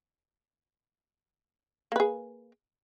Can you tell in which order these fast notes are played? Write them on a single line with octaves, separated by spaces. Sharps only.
A#3 B4 G#4